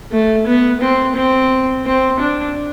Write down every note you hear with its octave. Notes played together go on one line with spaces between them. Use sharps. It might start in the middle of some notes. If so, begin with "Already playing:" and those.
A3
B3
C4
C4
C4
D4